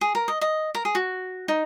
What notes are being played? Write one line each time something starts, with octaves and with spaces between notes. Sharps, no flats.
G#4
A#4
D#5
D#5
A#4
G#4
F#4
D#4